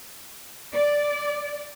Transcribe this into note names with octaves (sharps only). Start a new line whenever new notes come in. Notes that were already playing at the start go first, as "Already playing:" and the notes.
D5